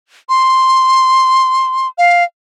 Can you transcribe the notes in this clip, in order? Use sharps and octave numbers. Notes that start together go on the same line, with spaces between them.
C6
F5